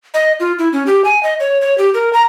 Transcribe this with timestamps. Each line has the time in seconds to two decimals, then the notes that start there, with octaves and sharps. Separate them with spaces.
0.14 D#5
0.40 F4
0.59 E4
0.73 C#4
0.86 G4
1.05 G#5
1.23 D#5
1.40 C#5
1.61 C#5
1.78 G4
1.94 A#4
2.13 A#5